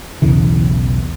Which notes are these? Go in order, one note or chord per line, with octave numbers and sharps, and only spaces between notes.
B1 E2 C#3 E3